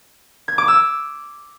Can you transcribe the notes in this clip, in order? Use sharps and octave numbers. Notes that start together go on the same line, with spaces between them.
G#6
D6
E6